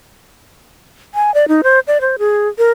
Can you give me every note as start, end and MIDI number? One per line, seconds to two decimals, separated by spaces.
1.14 1.33 80
1.34 1.45 74
1.48 1.61 63
1.63 1.79 72
1.87 2.01 74
2.01 2.16 72
2.19 2.48 68
2.58 2.71 70